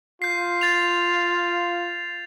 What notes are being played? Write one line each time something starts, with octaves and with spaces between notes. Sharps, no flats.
F4 G6 C7
A6 F7